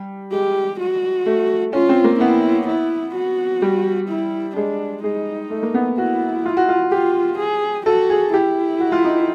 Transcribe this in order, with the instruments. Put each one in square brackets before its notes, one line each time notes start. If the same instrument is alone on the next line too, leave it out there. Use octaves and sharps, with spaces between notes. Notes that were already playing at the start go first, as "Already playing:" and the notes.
Already playing: [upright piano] G3
[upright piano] G#3 [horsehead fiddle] G4
[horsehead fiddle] F#4
[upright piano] A3
[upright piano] C#4 [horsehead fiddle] F4
[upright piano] C4
A#3
[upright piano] B3 [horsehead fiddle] E4
[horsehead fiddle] E4
F#4
[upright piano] G3
[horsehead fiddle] E4
[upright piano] G#3 [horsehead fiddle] D4
[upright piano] G#3 [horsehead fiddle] D#4
[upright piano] A3
A#3
B3
[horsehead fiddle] E4 [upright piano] F#4
[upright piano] F4
F#4
F4
[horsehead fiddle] F4 [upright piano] G4
[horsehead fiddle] G#4
[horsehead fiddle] F#4 [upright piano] A4
[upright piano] G#4
[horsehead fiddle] E4 [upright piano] G4
[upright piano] F#4
F4
D#4